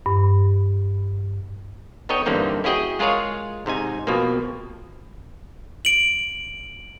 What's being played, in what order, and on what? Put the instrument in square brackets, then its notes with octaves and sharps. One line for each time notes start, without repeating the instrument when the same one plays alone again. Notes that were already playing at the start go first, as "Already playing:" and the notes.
[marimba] G2
[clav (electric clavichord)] B3 D#4 A4 C#5 D#5 G5
G2 D3 E3 A#3 C4 D#4
C#4 E4 F#4 G#4 D#5 G5
G#3 F4 G#4 A#4 C#5 F5
G#2 C3 D#4 G#5
F2 B2 F3 A#3
[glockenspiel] D7 F#7